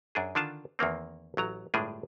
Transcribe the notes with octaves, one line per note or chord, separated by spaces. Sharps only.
F#2 D4 G#4
D3 D#3 D4 F4 A5
E2 D#3 A#3 C4
A1 F#3 A#5
G1 A2 G3 G#3 D4 G#4